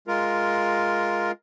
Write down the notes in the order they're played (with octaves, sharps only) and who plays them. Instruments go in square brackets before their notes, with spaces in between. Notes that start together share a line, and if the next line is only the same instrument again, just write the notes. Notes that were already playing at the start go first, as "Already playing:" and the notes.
[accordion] G#3 F4 A#4